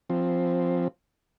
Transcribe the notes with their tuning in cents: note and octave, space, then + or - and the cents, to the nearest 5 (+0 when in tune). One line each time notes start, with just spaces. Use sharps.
F3 +0 C4 +0